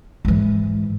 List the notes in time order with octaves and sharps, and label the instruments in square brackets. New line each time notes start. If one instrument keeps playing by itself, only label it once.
[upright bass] G#2 E3